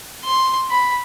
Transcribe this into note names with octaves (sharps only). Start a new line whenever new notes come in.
C6
B5